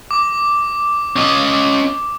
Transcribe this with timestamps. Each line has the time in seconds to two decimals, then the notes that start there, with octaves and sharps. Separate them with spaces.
0.11 D6
1.16 C#4 D#5